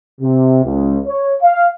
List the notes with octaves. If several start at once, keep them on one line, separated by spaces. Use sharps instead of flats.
C3
C#2
C#5
F5